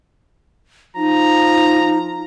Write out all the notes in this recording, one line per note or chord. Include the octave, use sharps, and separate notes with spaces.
F3 D#4 A#5